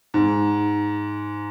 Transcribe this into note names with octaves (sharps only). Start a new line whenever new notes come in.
G#2